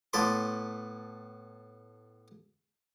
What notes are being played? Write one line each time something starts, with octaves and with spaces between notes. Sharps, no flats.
A2 B3 A5 B5 C6 D6